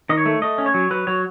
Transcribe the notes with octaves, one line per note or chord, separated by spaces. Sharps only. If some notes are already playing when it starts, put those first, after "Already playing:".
D#3 D#5
C#5
A3
A3 D#5
C#4
C#5
F#3
F#3 B4
F#3 C#5